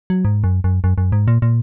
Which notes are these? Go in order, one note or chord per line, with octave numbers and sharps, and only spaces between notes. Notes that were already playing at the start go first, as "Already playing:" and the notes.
F#3
G#2
F#2
F#2
F#2
F#2
G#2
A#2
A#2